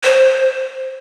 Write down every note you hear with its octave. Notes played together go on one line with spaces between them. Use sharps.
C5